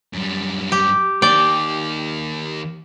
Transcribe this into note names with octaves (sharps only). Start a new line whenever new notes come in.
F#2 G3
G4
D#3 A#3 D5 G5